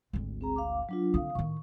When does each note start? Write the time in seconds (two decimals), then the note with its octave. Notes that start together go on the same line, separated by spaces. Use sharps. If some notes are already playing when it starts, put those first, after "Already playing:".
0.13 G#1 D2
0.41 C4 G#4 A#5
0.56 F5 D6
0.89 F#3 D4 F4
1.14 D3 C4 F5 D#6
1.35 A2 D#3 C#6